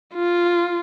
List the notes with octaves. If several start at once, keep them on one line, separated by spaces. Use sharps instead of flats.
F4